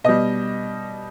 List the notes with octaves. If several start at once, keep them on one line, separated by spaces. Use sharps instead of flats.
B2 G3 D#5